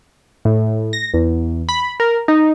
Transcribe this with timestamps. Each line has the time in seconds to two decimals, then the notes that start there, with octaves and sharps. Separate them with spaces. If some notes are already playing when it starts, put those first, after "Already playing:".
0.45 A2
0.93 A#6
1.14 E2
1.69 B5
2.00 A#4
2.28 D#4